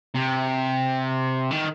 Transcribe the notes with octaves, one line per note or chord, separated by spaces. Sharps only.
C3
D#3